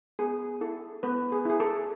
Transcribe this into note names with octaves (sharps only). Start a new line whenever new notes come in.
B3 G#4
E4 A4
B3 B4
G#4
E4 G#4
A4